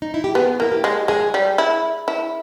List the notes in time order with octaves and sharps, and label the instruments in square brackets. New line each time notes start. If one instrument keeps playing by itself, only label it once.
[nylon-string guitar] D#4
E4
G4
[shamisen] B3 [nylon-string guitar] G#4
[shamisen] A#3 [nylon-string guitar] E4
[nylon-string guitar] G4
[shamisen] G#3
[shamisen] G#3 [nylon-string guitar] G#4
[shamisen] G3
E4
E4